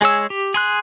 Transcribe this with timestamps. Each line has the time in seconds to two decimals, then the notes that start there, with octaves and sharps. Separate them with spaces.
0.01 G#3 G#4 C#5 E6
0.30 G4
0.54 G#4 C6 F#6